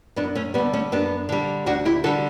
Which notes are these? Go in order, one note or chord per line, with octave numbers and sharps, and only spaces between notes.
F#2 B3 D4
A3 C#4
D3 G3 B3
A3 C#4
F#2 B3 D4
D3 G3
D2 D4 F#4
E4 G4
D3 G3 F#4 A4